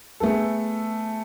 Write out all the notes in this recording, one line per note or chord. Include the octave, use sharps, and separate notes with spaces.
A3 B3 G#4 A4